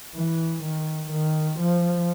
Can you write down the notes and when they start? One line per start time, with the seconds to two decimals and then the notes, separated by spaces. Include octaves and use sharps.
0.15 E3
0.63 D#3
1.11 D#3
1.59 F3